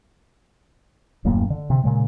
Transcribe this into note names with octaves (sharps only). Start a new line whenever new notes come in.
D#1 F#2 A2 A#3
D3
C3
A#2 C#3 G#3